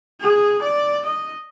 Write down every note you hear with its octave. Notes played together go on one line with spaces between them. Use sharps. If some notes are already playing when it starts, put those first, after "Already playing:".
G#4
D5
D#5